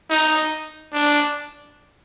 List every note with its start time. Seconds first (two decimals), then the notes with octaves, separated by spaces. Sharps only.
0.10 D#4
0.93 D4